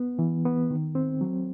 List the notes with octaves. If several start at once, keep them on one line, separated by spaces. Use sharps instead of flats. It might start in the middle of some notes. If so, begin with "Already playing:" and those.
Already playing: B3
E3
B3
D#3
C4
F#3